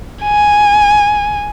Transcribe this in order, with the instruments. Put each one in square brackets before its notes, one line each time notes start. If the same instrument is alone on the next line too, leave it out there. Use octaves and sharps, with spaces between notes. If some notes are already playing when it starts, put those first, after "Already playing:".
[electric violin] G#5